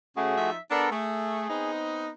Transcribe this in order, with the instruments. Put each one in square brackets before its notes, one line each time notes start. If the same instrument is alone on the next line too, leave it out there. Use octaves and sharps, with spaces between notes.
[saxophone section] C#3 [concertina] A3 F#4 G#4
[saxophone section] F3 D#4 E5
[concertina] B3 A4 A#4 [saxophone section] D4
[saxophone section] A3 [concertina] G#4
[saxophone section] B3 C4 D#4